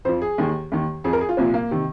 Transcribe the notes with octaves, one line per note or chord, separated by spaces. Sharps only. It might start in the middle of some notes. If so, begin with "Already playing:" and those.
F2 F3 C5
G#4
D#2 D#3
D#2 D#3
F2 F3 G#4
A#4
G#4
F4
C2 A#2 F3 C4
A#3
C3 D#3